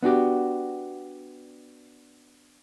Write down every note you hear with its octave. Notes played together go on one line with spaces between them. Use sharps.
B3 D4 F#4 G4